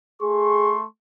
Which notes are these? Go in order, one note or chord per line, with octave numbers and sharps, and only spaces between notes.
A3 G#4 C6 C#6